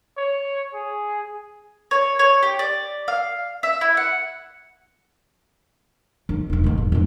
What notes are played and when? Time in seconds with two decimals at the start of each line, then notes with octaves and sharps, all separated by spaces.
0.17 C#5
0.74 G#4
1.91 C#5
2.19 C#5
2.43 G4
2.59 D5
3.08 F5
3.63 E5
3.81 E4
3.97 F#5
6.29 D#3
6.50 E1 A3
6.64 A2 D#3
6.77 E2
6.92 F2 A2